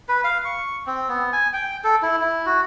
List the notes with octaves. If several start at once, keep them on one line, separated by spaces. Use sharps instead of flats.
B4
F5
C#6
C4
B3
G#5
G5
A4
E4
E4
F#4